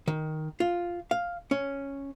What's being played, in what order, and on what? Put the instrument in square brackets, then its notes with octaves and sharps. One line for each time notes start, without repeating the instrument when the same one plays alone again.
[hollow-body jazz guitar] D#3
F4
F5
C#4